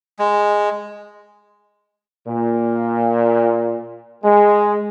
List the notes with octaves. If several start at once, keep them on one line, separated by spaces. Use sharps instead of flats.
G#3
A#2
G#3